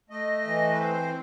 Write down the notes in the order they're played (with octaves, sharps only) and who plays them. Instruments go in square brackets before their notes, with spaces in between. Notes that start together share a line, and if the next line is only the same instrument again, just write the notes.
[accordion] A3 D#5
E3
B4
C4 C5